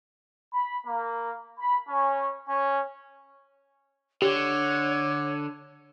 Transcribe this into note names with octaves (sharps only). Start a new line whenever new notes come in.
B5
A#3
B5
C#4
C#4
D3 G4 C#5